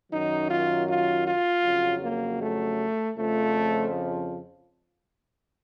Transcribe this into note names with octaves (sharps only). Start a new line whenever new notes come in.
F#2 D#3 F#3 D#4
F4
F4
F4
F2 C#3 F#3
A#3
A3
F2 C#3 F3 A3